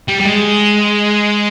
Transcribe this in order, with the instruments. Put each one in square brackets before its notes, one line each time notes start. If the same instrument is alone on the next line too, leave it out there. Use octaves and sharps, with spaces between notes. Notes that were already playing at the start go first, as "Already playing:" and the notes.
[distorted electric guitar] G3
G3
G#3